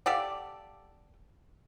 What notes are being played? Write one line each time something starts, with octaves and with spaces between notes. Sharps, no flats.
G4 A4 D5 F5 F#5